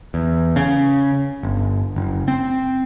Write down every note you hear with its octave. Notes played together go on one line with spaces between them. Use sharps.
E2
C#3
G1
F#1
C4